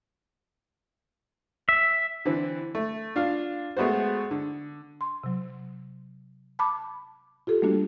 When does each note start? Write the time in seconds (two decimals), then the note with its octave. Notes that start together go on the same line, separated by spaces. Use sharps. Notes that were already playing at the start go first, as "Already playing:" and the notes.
1.69 E5
2.25 D3 E3 C4
2.75 A3
3.16 D4 F4 F5
3.77 G#3 A3 B3 F#4 C5
4.31 D3
5.01 C6
5.23 C3 F#3
6.59 A5 B5 D6
7.47 F4 G4 A4
7.62 G3 A3 A#3 D4 F#4